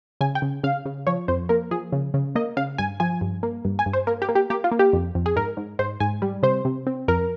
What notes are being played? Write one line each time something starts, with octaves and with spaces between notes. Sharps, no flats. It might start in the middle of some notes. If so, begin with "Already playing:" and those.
C#3 G#5
G5
C#3
C#3 F5
C#3
F3 C#5
F2 C5
A#3 A#4
F3 G#4
C#3
C#3
A#3 D#5
C#3 F5
G2 G#5
F3 G#5
G2
A#3
G2
G#5
G2
C5
A#3 A#4
G4
A#3
G4
A#3 G4
F4
A#3
G4
F2
F2
G#4
G#2 A#4
G#2
G#2 C5
G#2 G#5
G3
C3 C5
C3
C4
F2 A#4